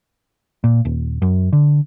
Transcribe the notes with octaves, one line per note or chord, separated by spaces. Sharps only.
A#2
D#1
F#2
D3